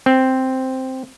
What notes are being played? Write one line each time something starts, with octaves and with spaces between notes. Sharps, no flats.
C4